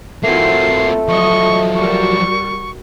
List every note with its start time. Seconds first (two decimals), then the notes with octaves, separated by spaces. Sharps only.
0.24 E3 A3 A#3 C4 F4 F#4 C7
1.08 F3 F#3 D#5 C#6
1.75 G3 F#4 A#4 C#6